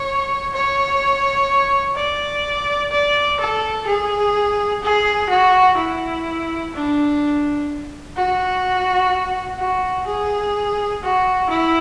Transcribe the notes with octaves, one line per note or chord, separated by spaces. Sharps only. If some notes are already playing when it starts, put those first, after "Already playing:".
Already playing: C#5
C#5
D5
D5
A4
G#4
G#4
F#4
E4
D4
F#4
F#4
G#4
F#4
E4